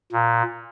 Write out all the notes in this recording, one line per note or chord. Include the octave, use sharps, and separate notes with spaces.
A#2